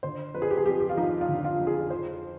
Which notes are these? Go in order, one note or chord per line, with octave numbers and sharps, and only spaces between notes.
D3 C5
F2 B4
G#4
G4
G#4
F2 G4
G4
F4
F3 D#4
F4
D3
F4
F2
G#4
F3 C5